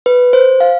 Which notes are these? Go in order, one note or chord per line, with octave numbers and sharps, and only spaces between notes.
B4
C5
F5